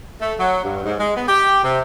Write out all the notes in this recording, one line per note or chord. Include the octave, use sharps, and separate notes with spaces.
A3
F#3
G2
G#2
G#3
B3
G4
C3